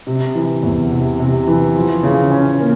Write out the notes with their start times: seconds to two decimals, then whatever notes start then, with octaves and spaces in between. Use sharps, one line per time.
0.07 C3
0.35 E3
0.63 E2
0.91 C3
1.20 C3
1.47 E3
1.75 F3
2.03 C#3
2.32 C#4
2.60 A#3